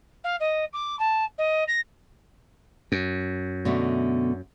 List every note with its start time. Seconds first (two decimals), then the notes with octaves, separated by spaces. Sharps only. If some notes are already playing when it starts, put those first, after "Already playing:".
0.24 F5
0.40 D#5
0.73 D6
0.99 A5
1.38 D#5
1.67 A#6
2.92 F#2
3.65 B2 D3 A3